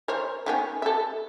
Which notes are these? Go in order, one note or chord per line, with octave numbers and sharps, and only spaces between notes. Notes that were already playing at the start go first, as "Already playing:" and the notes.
A#4 C5 C#5
D#3 B3 C#4
A4 E5